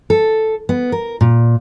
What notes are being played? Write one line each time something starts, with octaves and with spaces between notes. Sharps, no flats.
A4
B3
A#4
A#2